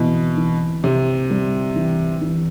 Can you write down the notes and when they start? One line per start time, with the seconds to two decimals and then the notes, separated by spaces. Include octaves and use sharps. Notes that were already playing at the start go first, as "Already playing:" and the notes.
Already playing: B2 E3 C4
0.37 E3
0.84 C3 C4
1.30 G3
1.76 E3
2.21 E3